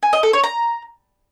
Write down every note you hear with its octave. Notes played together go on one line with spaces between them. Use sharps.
G#5
D#5
A4
C#5
A#5